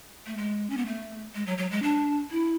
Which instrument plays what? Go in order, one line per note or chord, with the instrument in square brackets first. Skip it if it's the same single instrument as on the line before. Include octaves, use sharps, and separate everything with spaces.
[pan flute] A3
G#3
C#4
B3
A3
G#3
F#3
F#3
G#3
D4
E4